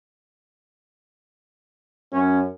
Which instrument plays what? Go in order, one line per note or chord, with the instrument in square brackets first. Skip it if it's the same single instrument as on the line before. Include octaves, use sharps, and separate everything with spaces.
[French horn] F#2 [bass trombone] C#4